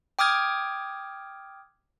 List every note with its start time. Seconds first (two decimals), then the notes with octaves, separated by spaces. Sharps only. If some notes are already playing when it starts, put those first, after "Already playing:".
0.19 G5 D6 D#6 F6 G#6